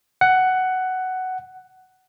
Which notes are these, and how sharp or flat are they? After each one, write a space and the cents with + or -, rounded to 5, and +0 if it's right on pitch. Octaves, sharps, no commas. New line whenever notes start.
F#5 +10